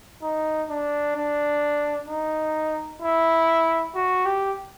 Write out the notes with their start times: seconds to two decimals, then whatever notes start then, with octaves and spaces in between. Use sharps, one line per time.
0.23 D#4
0.70 D4
1.16 D4
2.09 D#4
3.02 E4
3.95 F#4
4.26 G4